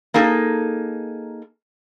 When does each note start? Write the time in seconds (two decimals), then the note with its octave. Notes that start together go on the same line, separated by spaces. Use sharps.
0.14 A#3 D#4 G#4 A4